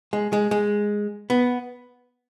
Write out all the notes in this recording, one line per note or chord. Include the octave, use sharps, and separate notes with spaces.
G#3
G#3
G#3
B3